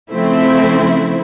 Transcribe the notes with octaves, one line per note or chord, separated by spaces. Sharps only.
C#3 F3 A3 C4 E4